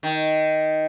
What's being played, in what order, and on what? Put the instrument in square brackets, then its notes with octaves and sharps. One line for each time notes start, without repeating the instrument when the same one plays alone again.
[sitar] D#3